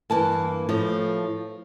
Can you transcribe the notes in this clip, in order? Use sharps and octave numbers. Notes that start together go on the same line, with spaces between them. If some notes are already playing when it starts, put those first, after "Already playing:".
G2 E3 A#3 A5
A2 F3 A3